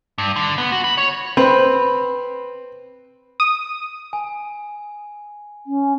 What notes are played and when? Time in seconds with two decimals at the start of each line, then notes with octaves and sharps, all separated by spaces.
0.18 G2
0.36 D3
0.58 B3
0.72 F#4
0.84 B5
0.98 C#5
1.37 C4 B4
3.40 D#6
4.13 G#5
5.66 C#4